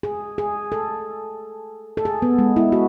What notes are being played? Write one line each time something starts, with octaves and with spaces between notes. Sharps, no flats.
G#4
G#4
A4
A4
G#4
B3
G#3
E4
F#4